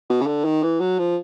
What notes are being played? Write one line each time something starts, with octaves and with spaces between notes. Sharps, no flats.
B2
C#3
D3
D#3
E3
F#3
F3